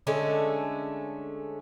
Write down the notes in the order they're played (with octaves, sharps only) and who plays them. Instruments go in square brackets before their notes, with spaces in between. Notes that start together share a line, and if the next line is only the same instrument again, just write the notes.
[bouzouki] D3 G#3 A3 C#4